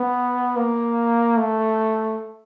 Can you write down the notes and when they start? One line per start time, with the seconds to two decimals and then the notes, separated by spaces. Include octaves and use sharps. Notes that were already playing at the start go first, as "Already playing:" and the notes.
Already playing: B3
0.56 A#3
1.37 A3